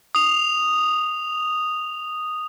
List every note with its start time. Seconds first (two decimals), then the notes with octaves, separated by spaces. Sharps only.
0.15 D#6 F7